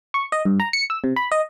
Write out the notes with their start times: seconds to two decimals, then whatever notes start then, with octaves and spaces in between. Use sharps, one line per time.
0.14 C#6
0.32 D#5
0.45 G2
0.60 A#5
0.73 C#7
0.90 E6
1.04 C3
1.16 B5
1.32 D#5